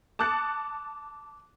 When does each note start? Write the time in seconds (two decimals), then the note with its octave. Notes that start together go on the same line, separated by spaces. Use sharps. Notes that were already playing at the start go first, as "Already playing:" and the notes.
0.19 A5 D6 D#6 F#6 A6 C#7